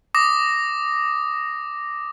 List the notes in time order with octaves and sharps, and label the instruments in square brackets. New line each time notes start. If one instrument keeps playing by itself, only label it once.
[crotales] D6 D#6 A#6